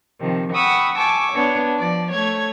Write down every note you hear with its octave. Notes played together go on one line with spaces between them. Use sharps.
C3 D#3 F3
F#5 G5 B5 C#6 D#6 E6
G#5 A5 C#6 D6 E6
B3 D4 C#5
F3 D5
A3 C#5 G#6